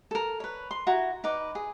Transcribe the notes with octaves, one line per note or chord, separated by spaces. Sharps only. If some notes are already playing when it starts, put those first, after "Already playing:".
A4 A#4
B4 C#5
C6
E4 F#4 A#5
D#4 B4 D6
G#4